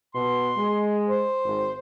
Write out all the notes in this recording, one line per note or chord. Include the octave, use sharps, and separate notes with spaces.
B2 C6
G#3
C5
G#1